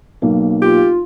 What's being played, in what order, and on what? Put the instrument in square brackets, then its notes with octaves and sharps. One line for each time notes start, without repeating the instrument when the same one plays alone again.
[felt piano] B1 A#3
[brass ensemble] F4 [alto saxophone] G4